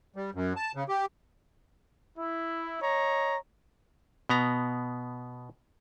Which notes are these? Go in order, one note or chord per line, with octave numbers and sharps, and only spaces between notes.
G3
F#2
A5
C#3
G4
E4
C#5 D#5 A#5
B2 B3 A#5